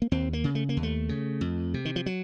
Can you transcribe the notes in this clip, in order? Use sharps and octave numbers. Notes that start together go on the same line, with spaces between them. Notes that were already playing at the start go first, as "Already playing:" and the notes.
A#3
D#2 C4
A#3
C#3
A3
A#3
D#2
A3
C#3
F2
C3
D#3
F3
F#3